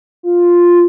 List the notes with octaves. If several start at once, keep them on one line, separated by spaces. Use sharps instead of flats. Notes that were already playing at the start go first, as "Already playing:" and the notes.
F4